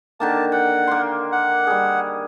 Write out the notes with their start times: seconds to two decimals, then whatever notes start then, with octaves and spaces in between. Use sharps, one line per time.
0.20 D3 D#3 A#3 A5
0.52 F#5 G5
0.87 A#3 C6
1.32 F#5
1.67 G3 G#4